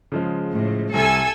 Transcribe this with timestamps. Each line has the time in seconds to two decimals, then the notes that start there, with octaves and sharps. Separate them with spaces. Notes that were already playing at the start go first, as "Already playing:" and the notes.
0.12 C#3 F3 G#3
0.52 A2
0.94 C2 A4 G#5 E6